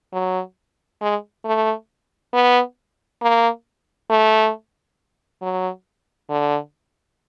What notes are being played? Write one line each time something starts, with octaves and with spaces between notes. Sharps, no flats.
F#3
G#3
A3
B3
A#3
A3
F#3
D3